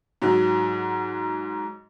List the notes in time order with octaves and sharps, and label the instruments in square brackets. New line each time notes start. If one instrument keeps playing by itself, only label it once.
[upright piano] G#2 F#3